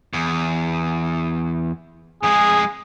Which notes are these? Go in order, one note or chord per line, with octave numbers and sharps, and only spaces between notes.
E2
F2 G#3 G#4